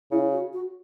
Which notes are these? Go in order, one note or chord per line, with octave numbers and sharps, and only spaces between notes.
C#3 E4
F#4
F#4